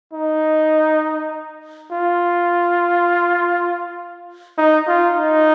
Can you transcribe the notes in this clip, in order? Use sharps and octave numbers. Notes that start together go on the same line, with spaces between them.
D#4
F4
D#4
F4
D#4